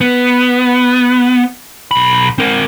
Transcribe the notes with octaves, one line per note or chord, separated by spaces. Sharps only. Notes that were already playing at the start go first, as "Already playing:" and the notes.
B3
B1 B5
C4 A#4